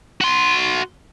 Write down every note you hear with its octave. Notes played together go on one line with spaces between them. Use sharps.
F#4 C6